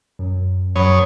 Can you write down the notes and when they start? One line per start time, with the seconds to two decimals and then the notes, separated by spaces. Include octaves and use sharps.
0.19 F#2
0.76 F#2 C#5 B5 C6 D#6